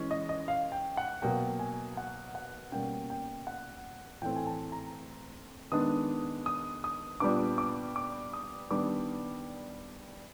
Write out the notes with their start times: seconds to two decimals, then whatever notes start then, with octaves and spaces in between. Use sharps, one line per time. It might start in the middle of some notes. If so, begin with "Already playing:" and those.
Already playing: E3 G#3 C#4
0.11 D#5
0.29 D#5
0.48 F5
0.72 G5
0.97 F#5
1.22 B2 F#3 A#3 G5
1.59 G#5
1.97 F#5
2.35 F#5
2.72 B2 G3 A#3 C#4 G5
3.10 G5
3.47 F#5
4.22 A2 E3 A3 C4 G5
4.36 G#5
4.47 A5
4.72 A#5
5.72 D#3 G#3 B3 D4 D#6
6.46 D#6
6.84 D#6
7.20 A#2 G3 B3 D4 D6
7.58 D6
7.96 D6
8.33 D#6
8.71 D#3 G3 B3 D4 D6